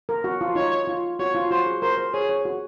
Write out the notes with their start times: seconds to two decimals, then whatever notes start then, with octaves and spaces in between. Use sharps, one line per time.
0.09 A#4
0.24 F#4
0.41 F4
0.55 D#4 C#5
0.87 F4
1.19 F#4 C#5
1.35 F4
1.51 F#4 C5
1.66 G#4
1.82 A#4 C5
1.97 C5
2.14 G#4 C#5
2.29 C#5
2.45 F#4